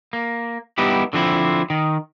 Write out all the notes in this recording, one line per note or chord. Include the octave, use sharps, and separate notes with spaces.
A#3
G3 B3 D#4 E4 G4
D3 F3 C4 E4
D#3